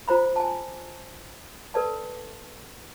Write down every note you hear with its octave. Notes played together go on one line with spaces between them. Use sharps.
F4 C5 A#5 B5
G#5 A5
A4 B4 D5 A5